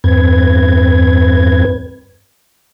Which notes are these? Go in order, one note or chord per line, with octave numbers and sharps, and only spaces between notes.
E2 G2 C4 B4 G#6